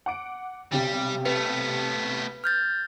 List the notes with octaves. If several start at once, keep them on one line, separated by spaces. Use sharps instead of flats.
F#5 D6 D7
B1 C3 G3 G4
A3 B3 B4
F6 G6 A6